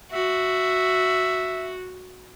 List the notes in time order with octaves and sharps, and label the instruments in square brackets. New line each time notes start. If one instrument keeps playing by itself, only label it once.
[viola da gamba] F#4 [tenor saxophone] E5